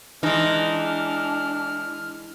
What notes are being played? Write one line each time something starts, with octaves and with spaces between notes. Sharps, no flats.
E3 G#3 D4 D#4 F6